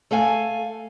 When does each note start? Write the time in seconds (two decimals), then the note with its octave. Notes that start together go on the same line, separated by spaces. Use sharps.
0.11 A3 A4 F5 G#5